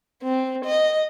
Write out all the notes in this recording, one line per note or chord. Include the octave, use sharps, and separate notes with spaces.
C4
D#5